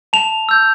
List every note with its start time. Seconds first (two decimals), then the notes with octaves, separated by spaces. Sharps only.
0.13 A5 F7
0.49 E6 G6